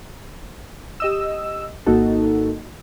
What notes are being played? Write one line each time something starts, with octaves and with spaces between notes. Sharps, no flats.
G4 D#5 E6
G#1 A#3 D#4 F#4 A4